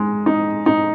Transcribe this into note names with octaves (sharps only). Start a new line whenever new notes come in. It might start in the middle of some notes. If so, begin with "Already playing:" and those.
Already playing: G#3 D#4
D#4
D#4